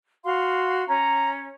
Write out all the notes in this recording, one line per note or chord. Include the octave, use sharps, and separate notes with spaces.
F#4 F5 C6
C#4 A#5